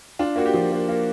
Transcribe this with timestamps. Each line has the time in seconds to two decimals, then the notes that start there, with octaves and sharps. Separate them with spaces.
0.19 D4 F4
0.36 A#3 F#4
0.46 G4
0.54 F3
0.71 A#3
0.89 A#3